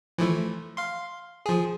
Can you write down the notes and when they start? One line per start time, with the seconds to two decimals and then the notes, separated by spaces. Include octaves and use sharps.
0.18 E3 F3 A3
0.77 F5 C6
1.46 F3 G#4